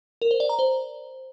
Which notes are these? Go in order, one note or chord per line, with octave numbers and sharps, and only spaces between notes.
A#4
C5
D5
A#5
C5